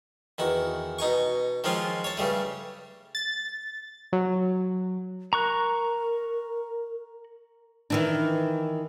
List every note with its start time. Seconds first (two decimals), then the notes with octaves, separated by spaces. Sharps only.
0.38 E2 D#3 F#4
0.99 B2 D#4 G#5 C#6
1.64 D#3 F3 G#3 C4 C#4 F4
2.04 C#5 A5
2.17 G2 C#3 G3 A3
3.15 A6
4.13 F#3
5.33 A#4 A#5 C#6 F#6
7.90 D#3 E3 D4